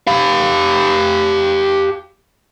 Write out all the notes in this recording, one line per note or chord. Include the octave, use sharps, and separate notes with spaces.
G4 F5